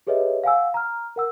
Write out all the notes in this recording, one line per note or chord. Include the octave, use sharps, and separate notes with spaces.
G4 G#4 B4 C#5 D#5 E5
F5 F#5 G#5 E6
A#5 F6
A#4 F#5 E6